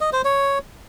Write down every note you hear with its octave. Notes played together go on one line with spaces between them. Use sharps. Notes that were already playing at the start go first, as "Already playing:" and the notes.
D#5
C5
C#5